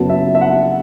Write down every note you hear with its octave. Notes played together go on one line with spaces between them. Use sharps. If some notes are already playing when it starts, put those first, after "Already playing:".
Already playing: F#1 F#2 F#3 B3 A5
E5
E5
F#5